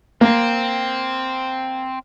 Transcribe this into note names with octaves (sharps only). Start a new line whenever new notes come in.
A#3 C4